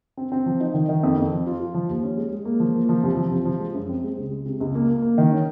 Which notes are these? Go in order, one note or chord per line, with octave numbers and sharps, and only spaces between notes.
C4
C4
F3
D#4
D#3
D#3
F2
F2
F3
F4
F4
F3
D#2
C#4
G#3
G#3
A#3
F3
A#3
F3
C2
F3
C2
F3
G#3
F#2
C4
G#3
C#2
G#3
C3
C#2
A#3
A#3
A#3
D#3
C#4